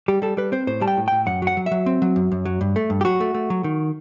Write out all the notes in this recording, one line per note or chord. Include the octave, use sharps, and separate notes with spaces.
G3 G4
G3 A4
G3 B4
C4 C5
A2 C5
G3 A5
G5
A2
A2 G5
F#2 F#5
F#3 F#5
F#3
E5
F#3
C4
F#3
F#2
F#2
F#3
G2
A3
G2
G4
F#3 F#4
A3
A3
F#3
D#3